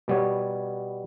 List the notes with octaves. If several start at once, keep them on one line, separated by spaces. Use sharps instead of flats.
B2 G3 B3 C#5